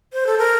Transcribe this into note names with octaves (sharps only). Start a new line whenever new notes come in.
C5
A4
A#4